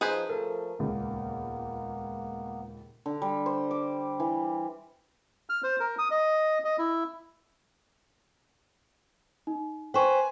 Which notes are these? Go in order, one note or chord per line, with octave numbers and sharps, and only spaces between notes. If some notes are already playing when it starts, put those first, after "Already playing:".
F3 D#4 G#4 B4 C5
F3 A3 A4 A#4
D#1 C#2 A#3 B3
D3
G3
C5
D6
E3
F6
C5
A#4
D#6
D#5
D#5
E4
D#4
B4 C5 G5 G#5 C#6